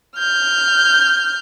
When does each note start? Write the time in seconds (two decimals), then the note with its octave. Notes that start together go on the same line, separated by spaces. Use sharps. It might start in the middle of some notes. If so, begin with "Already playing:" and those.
0.17 F6 G6